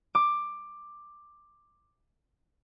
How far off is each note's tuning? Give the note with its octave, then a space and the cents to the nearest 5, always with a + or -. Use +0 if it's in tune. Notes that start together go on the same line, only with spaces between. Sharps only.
D6 +10